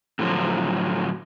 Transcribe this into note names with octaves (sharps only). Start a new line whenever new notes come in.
A2 D3 F3 F#3